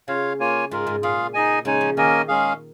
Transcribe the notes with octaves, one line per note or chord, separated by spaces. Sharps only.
C#3 F4 C#5 F5
A#3 F4 C#5 G#5
G#2 G#3 F4 A#4
G#2
A#2 F4 G#4 F5
D#4 G#4 D#5 G#5
C#3 G#3 D#4 C#5 G#5
F3
D#3 A#3 C#4 A#4 D#5 G#5
G#3 C#4 G#4 F5